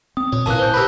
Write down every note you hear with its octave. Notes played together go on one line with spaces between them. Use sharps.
C4 D#6
A#2 C#5
A1 A#2 E3 A#3 G#5 A5 F#6
C5 G6 G7
G4 A#4 B4 B5 E6